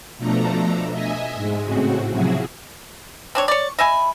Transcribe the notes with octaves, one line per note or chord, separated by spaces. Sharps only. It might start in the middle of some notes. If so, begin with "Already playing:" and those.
B2 F3 A3 D4 A4 A#5
D#5 E5 G#5
G#2 G#3
A2 C#3 C4 F#4
C3 F3 F#3 E4 F#4 G#4
C4 D4 C#5
C#5 D5 C#6
D#5 E5 G#5 B5